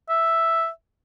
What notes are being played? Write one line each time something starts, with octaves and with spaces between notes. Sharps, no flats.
E5